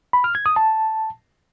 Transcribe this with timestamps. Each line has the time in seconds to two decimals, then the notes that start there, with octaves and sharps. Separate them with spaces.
0.13 B5
0.24 F6
0.35 G#6
0.46 D#6
0.56 A5